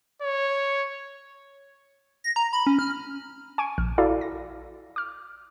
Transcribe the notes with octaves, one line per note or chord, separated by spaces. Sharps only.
C#5
A#6
A#5
B5
C#4
F6
G#5 C#6 D7 D#7
A#1 F6
E4 F#4 A4 D5 F5 A#5
A#6
D6 F6